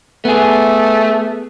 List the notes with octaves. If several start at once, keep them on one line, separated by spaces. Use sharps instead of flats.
A3 B3 G#4